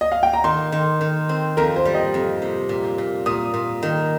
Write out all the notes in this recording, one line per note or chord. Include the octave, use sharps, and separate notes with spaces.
D#5
F5
G5
A#5
D#3 C6
D#3
D#3
C4
F2 A#4
C5
G3
D#5
F2
C3
A#2
A#2
A#2 D#6
A#2
D#3